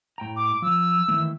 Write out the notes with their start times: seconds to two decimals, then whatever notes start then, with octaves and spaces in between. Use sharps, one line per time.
0.18 A2 G5 A#5
0.36 D6
0.62 F3 E6
1.08 D#3 E3 A3